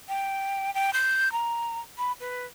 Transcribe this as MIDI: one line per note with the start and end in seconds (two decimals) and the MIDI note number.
0.09 0.73 79
0.74 0.93 79
0.93 1.32 91
1.32 1.79 82
1.98 2.12 83
2.20 2.46 71